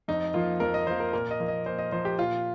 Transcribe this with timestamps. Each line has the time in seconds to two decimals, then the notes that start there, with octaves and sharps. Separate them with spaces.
0.08 F2 D#4
0.34 F3 A#3 F4
0.60 F2 A#4
0.74 D#5
0.87 F3 A#3 C5
1.00 A#4
1.13 A#2 A#4
1.31 D#5
1.40 F3 A#3
1.48 D#5
1.66 A#2 C5
1.78 D#5
1.92 F3 A#3 C5
2.05 G4
2.18 A#2 F4